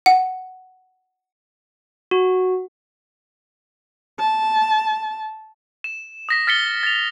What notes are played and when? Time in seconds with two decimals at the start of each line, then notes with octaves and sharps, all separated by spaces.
0.06 F#5
2.11 F#4
4.19 A5
5.84 E7
6.29 D#6 A#6 B6
6.47 F6 A6 B6 C#7 G7
6.83 A6 F7